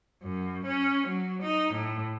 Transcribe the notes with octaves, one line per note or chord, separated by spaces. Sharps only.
F#2
C#4
F#3
D#4
A2